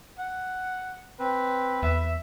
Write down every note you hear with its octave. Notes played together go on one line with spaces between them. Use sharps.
F#5
C4 B4
E2 E5